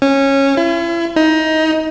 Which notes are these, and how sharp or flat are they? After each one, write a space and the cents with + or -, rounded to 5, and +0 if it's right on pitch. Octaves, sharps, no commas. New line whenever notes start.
C#4 -15
E4 +40
D#4 +20